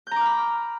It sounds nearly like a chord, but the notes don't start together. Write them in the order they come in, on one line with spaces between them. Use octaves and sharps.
G6 A#5 D6 F6 B5